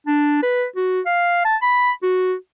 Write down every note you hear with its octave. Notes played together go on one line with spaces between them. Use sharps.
D4
B4
F#4
F5
A5
B5
F#4